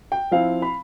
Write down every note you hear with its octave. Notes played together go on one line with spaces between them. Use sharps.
G5
F3 C4 E4 F5
B5